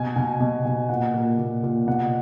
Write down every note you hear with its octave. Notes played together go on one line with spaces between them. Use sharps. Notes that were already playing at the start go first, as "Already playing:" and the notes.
Already playing: B2 G#5
B2
B2
B2
A#2 F#5
A#2
A#2
A#2
B2 F#5